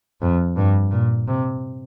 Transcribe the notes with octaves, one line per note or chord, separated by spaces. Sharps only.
F2
G2
A#2
C3